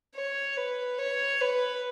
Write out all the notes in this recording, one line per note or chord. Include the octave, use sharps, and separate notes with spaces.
C#5
B4
C#5
B4